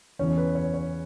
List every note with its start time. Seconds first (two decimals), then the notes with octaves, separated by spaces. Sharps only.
0.19 E2 C#3 E3 C#4
0.38 B4
0.55 C#5
0.74 C#5